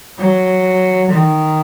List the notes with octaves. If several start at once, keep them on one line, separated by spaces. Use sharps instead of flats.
F#3
D#3